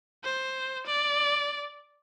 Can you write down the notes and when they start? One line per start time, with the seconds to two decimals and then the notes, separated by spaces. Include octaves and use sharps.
0.24 C5
0.87 D5